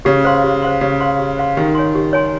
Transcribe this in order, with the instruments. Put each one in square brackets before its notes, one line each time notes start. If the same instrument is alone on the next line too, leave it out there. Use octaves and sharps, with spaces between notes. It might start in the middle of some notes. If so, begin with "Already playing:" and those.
[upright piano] C#3 [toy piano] G4
[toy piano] C5 F5 C6
G4
C5 F5 C6
[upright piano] C#3 [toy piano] G4
[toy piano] C5 F5 C6
G4
C5 F5 C6
[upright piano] D#3 [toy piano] G4
[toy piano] C#5 G#5 C6
G4
C#5 G#5 C6